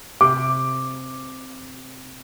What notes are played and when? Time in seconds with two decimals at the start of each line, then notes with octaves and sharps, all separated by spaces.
0.21 C3 D6